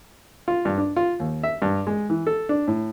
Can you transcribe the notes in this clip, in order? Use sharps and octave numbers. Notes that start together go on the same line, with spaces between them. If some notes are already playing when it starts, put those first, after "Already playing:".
F4
G2
D4
F4
D#2
E5
G2
G#3
E3
A4
D4
A2